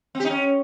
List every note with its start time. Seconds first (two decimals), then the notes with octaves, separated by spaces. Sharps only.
0.15 C4
0.20 G4
0.25 D#4
0.30 C#4